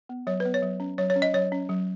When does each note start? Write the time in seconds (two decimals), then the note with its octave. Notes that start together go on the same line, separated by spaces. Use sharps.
0.09 B3
0.27 F#3 C#5
0.40 B4
0.45 B3
0.54 C#5
0.62 F#3
0.80 C#4
0.98 F#3 C#5
1.10 C#5
1.16 C#4
1.22 D#5
1.34 F#3 C#5
1.52 C#4
1.69 F#3